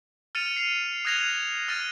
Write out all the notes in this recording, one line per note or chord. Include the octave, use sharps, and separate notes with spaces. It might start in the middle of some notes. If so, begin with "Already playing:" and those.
F6 A6 C#7 D#7 F7
C7 F7
D#6 F#6 G#6 A#6 C7 F7
F6 A6 A#6 D#7